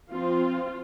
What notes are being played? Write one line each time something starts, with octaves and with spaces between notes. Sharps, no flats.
F3 C4 F4